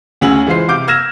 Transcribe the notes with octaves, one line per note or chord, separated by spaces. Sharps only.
D2 C#3 C#4 F#4 E6 F#7
E3 G#3 F4 C5 C7
C3 F5 D6 G6 D7
E6 F6 G#6 A#6 E7